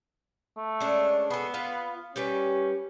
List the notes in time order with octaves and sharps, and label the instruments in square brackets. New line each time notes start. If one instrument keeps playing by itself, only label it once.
[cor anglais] A3
[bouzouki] G#3 C#4 D4
[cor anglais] B3 [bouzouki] G#4 A4
[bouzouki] F4 B4 F5
[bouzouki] G3 G4 B4 [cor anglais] C#4